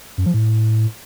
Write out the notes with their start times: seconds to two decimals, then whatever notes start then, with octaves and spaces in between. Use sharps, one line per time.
0.18 F#2
0.26 F3
0.34 A2